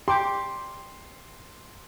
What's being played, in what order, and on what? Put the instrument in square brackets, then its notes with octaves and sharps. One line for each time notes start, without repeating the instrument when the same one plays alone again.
[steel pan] G4 D6 [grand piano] C6